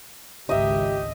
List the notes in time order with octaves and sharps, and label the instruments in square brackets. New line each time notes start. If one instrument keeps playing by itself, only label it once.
[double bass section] G#1 C#2 [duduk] G4 [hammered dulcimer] D#5 E5